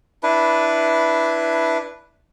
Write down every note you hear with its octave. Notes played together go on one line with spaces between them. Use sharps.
D4 E4 B4